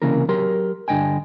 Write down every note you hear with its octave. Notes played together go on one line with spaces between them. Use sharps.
C2 C#3 E3 A#3 A#4
F#3 G4 A#4 C6
G2 D3 G3 D#5 G5 G#5